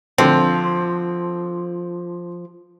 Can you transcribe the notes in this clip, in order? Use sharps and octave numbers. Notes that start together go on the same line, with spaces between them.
D3 F3 C4